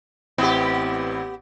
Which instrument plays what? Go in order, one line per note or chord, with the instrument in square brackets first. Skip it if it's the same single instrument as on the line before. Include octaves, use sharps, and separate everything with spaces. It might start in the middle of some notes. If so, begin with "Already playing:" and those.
[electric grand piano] A1 C4 E4 [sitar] B3 G4